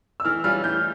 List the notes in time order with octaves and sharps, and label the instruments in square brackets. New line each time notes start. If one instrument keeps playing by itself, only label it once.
[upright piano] E6
[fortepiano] E3 [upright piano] F6
[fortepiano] G3 C#4 F4 [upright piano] F6
[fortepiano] E3 [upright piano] G6